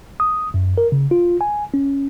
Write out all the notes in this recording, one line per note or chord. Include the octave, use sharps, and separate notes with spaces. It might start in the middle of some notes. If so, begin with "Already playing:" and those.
D#6
F#2
A#4
C#3
F4
G#5
C#4